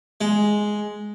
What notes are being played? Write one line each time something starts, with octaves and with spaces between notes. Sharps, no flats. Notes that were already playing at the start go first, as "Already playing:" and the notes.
G#3